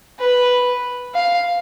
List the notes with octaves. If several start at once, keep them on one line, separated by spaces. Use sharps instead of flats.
B4
F5